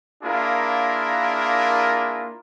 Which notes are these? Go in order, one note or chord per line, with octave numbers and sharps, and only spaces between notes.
A#3 D4 E4 F4 G#4 A#4